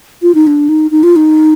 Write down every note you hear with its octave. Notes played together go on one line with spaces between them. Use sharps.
F4
D#4
D4
D#4
D#4
F4
D#4